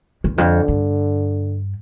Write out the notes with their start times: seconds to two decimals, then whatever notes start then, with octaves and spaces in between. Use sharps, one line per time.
0.24 E2
0.37 F2 D3
0.68 G2